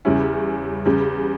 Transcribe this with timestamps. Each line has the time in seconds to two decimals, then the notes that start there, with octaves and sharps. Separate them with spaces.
0.05 E2 C#3 G3 C#4 E4
0.86 E2 C#3 G3